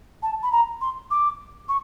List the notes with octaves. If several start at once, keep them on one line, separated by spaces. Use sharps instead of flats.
A5
B5
A#5
C6
D6
C#6